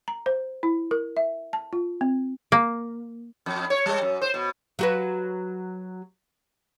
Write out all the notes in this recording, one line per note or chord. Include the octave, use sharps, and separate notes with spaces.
A#5
C5
E4
A#4
E5
A5
F4
C4
A#3
F2
C#5
G3
F#2
C5
B2
F#3 F#4 B4